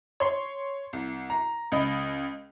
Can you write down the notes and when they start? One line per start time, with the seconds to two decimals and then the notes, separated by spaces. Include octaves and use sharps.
0.20 C#5 C6
0.93 C2
1.30 A#5
1.72 C#2 D#5 B5